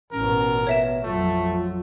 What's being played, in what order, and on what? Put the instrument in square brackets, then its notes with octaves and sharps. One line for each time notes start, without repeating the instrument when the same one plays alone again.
[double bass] A1 B2 [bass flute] C#4 [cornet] A#4
[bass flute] B3 [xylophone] C#5 E5 E7
[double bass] F2 F#3 [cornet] A3 [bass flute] F4